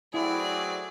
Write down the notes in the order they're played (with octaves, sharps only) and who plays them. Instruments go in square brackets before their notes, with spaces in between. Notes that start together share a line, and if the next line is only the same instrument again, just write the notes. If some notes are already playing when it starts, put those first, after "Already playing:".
[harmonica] F#3 A3 C4 [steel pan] E4 [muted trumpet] G#4 [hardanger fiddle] D5